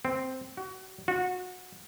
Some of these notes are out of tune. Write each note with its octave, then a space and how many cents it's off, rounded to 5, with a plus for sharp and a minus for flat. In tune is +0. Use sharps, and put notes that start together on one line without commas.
C4 -5
F#4 +30
F#4 -25